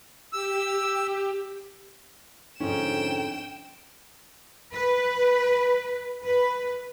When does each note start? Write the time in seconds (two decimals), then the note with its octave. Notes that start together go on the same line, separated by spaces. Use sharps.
0.33 G4 E6
2.60 F2 G#2 D3 C#4 G5 E7
4.72 B4
6.24 B4